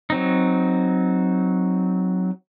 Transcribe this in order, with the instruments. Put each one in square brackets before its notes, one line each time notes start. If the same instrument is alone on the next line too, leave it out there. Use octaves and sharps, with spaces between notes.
[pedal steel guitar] F#3 C4 D#4